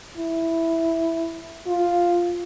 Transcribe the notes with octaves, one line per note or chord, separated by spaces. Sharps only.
E4
F4